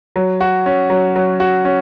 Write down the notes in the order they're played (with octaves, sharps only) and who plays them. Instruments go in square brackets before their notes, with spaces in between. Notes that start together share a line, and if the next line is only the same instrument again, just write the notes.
[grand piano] F#3
F#4
C#4
F#3
F#3
F#4
C#4